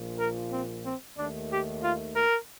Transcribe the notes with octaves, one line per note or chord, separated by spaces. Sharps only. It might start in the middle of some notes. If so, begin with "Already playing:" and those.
Already playing: A#1 A#2 F3
A#4
C4
C4
D#2 D#3 A3 D4
G4
F4
A#4